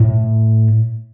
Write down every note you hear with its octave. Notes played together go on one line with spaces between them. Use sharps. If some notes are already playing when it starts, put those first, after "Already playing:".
Already playing: A2